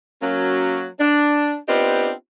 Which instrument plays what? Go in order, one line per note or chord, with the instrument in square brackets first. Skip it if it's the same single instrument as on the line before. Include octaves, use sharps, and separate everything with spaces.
[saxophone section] F#3 A#3 C#4
D4
B3 C4 D4 D#4 F4 G4